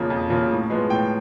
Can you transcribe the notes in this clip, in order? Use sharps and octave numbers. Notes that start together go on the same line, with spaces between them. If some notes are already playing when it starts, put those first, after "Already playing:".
Already playing: F2 C#3 F3 A#3
F2
C#3 F3 A#3
A2
F3 G#3 B3
A2 G5